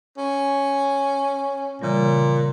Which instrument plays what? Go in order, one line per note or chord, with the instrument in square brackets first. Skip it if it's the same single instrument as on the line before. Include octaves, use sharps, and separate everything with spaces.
[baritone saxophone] C#4
[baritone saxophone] A#2 [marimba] C#3 E3 G3